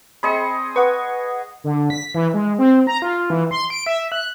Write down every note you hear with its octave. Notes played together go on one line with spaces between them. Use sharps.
C4 G#4 D#5 B5 C#7
B4 F#5 C#6 D#6
D3
B6
E3
G#3
C4
A#5
F4
E3
C6
D7
E5
F#6